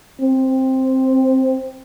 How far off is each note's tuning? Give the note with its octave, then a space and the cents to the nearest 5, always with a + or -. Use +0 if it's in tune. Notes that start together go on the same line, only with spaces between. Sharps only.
C4 +5